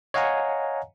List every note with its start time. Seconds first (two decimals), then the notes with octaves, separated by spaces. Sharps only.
0.14 C#5 D#5 F5 F#5 G#5 A#5